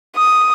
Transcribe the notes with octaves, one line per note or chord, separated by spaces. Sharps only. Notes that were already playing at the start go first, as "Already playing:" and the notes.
D#6